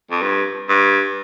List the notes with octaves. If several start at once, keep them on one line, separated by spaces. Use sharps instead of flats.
F2
G2
G2